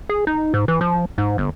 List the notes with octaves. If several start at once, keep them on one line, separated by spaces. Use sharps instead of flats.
G#4
D#4
G#2
E3
F3
G#2
G1